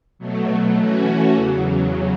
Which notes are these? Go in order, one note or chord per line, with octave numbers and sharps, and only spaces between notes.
B2 F#3 A3
E3 A3 C#4 F#4
E2 C#3 F#3